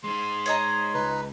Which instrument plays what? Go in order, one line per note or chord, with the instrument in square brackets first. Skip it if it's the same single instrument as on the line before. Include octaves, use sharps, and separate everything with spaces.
[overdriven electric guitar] G#3 D#4 [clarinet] C6
[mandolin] C#5 D#5 A#5
[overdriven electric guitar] C#2 [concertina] D#4 B4